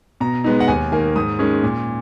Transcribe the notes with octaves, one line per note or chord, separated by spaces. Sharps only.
B2 A#5
G#3 B3 D#4
F#5
D#2 G#5
D#3 A#3 G#5
G#2 D#6
D#3 G#3 C#4
A#2